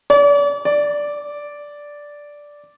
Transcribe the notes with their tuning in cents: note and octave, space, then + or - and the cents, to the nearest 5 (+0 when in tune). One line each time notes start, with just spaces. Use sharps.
D5 -40
D5 -5